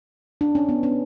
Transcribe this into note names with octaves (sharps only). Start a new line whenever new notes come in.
D4
C#4
B3
C#4